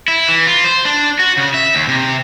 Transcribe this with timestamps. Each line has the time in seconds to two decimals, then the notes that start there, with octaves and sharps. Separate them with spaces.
0.08 E4
0.29 E3
0.47 F4
0.64 C5
0.85 D4
1.19 F#4
1.37 C#3
1.54 E5
1.75 D#2
1.88 C3